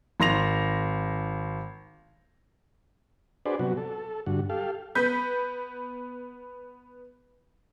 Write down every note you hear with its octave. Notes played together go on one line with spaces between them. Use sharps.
G#1 C6 A#6 F7
D4 F#4 G#4 B4 C5 D5
C3 F#3 B3 F#4
A4
G2 D3 F#4
G4 A4 F5
B3 B4 G6 B6